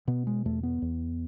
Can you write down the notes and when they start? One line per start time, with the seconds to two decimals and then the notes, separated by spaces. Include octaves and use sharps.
0.08 B2 B3
0.27 G#3
0.45 E2 A3
0.63 B3
0.82 E2